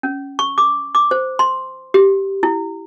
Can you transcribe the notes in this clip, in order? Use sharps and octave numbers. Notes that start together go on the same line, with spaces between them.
C#4
C#6
D6
D6
C5
C6
G4
E4